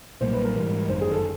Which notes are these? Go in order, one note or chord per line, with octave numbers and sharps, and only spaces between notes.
B1 A#2 G3 A#3 C5
B4
A#4
G#2 E3 G3
G1 F#2 D#3 C5
G#4
A4